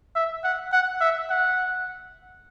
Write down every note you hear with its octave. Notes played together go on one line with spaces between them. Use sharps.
E5
F#5
F#5
E5
F#5